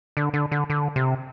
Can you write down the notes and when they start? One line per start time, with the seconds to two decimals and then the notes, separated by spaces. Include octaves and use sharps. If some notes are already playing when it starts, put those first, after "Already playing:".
0.17 D3
0.33 D3
0.51 D3
0.70 D3
0.96 C3